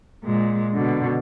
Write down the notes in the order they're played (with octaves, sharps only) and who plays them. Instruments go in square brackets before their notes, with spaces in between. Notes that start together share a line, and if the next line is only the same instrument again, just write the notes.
[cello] A#2 G#3
B2 D3